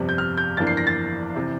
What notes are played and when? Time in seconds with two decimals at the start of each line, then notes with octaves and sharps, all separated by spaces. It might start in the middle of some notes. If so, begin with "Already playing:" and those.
Already playing: G1 F2 C3 G3
0.09 G6
0.18 F6
0.37 G6
0.57 G1 F2 E3 A#3 D4 A6
0.67 C7
0.77 A#6
0.87 A6
1.35 C3 E3